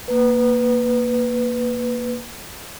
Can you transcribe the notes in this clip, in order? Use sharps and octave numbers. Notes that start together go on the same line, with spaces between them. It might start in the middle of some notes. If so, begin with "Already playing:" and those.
A#3 B4